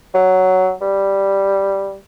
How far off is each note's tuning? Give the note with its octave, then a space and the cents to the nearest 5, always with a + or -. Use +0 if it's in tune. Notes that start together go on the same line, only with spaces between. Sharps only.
F#3 +5
G3 +0